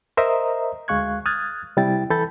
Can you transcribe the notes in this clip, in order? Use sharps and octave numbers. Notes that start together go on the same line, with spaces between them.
A#4 C5 D#5 E5 A#5 D#6
D2 G#3 F5 C#6 F#6 G#6
D#6 F6 F#6 G#6 A6
C3 G3 E4 G5 A6
E3 A4 B5 G6 A6